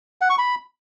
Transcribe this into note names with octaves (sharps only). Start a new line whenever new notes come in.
F#5
C#6
B5